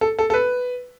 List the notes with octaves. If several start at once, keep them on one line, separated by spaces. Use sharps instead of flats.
A4
A4
A4
B4